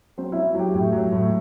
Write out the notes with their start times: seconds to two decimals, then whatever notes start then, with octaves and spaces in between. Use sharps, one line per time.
0.18 F#3 C4 C5
0.32 F#3 E4 E5
0.55 F#3 G4 G5
0.73 A2 G4 G5
0.92 F#3
1.12 A2